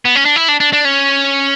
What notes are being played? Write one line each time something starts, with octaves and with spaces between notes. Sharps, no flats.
B3
C#4
D4
E4
D4
D4
D4
C#4